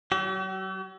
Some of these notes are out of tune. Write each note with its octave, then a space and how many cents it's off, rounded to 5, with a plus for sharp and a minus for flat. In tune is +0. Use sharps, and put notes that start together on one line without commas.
F#3 +35 G4 -45